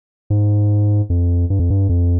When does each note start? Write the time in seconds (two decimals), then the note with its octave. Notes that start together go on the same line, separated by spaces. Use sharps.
0.30 G#2
1.10 F2
1.50 G2
1.59 F2
1.70 G2
1.89 F2